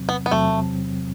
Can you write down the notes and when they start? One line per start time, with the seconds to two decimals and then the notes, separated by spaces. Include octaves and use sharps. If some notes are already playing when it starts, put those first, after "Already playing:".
Already playing: E2 C3 F#3 C4
0.09 B3
0.26 B3
0.31 E2 C3 F#3 A3 C4